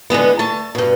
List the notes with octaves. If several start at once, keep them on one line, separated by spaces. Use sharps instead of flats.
D3 E3 G#3 B3
A3 A5
G2 B2